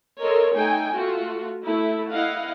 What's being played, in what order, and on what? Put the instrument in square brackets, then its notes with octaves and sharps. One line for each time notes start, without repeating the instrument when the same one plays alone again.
[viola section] A4 A#4 C#5 D#5 C6
A3 D#4 G5 G#5
A3 F4 F#4
A3 E4
E4 D#5 F5 F#5